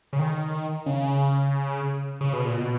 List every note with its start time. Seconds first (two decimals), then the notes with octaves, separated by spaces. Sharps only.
0.13 C#3
0.19 D#3
0.86 C#3
2.21 C#3
2.33 B2
2.45 A#2
2.57 B2